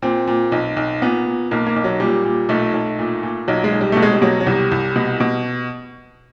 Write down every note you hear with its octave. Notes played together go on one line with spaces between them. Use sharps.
A#2 C4
A#2
B1
B1
A#2 B3
A#2
B1 A#3
A#3
B1
F#3
A#2 G3
A#2
B1 A3
B1
A#2
A#2
B1 F#3
G#3
B1
G3
B2 A3
G#3
G3
B2 F#3
F#3
C2 G3
C2
B2
B2